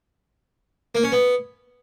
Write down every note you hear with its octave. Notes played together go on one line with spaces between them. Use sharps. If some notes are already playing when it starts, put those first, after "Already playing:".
A#3
C#4
B3